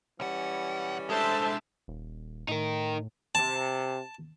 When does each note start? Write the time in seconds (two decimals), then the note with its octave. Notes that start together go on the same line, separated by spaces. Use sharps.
0.20 B1 E3 G3 C#4 F#5
1.10 G#3 D4 A4 C5 E5 A5
1.88 D#1
2.49 A2 D#4 A#4
3.35 C3 A5